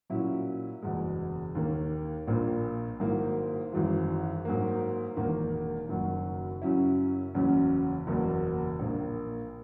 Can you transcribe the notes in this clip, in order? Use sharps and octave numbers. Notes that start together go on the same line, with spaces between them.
A#2 F#3 C#4 E4
F#1 E2 B2 G#3
D#2 D#3 A#3
A#1 A#2 A#3
G#1 G#2 F#3 A#3 E4
G#1 F#2 E3 G#3
G#2 F#3 A#3
E1 E2 D#3 A#3
F#1 F#2 D#3 F#3
F#2 C#3 F#3 C#4 E4
F#1 E2 C#3 F#3 C#4
F#1 E2 B2 F#3 A#3
A#1 A#2 A#3